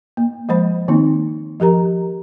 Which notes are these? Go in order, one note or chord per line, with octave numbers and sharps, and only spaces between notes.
A#3
F3 G#3 C5 B5
D#3 A#3 C4 D#4
F3 G4 A#4 A#5